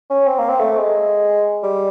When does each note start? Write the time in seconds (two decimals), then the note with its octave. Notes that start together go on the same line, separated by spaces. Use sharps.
0.10 C#4
0.27 C4
0.39 A#3
0.49 C4
0.60 A3
0.78 G#3
1.63 G3